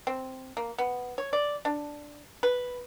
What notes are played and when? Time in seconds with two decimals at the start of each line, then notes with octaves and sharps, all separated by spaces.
0.07 C4
0.57 A#3
0.78 B3
1.18 C#5
1.33 D5
1.65 D4
2.43 B4